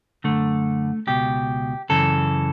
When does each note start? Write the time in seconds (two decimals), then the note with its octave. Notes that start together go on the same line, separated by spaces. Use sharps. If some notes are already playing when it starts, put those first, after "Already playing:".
0.24 F#2 D3 A3
1.07 C#2 B2 G4
1.89 F#2 C#3 E3 A4